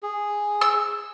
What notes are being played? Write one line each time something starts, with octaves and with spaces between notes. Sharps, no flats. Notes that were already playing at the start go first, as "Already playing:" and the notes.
G#4
E6